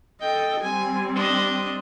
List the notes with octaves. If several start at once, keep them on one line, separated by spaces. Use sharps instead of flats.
A4 D#5 G5
G3 C4 G#5
D4 D#5